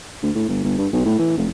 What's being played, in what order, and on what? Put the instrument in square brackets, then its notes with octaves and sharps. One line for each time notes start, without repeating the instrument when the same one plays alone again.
[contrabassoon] D2
A2
G1
G1
G2
B1
A2
E3
F1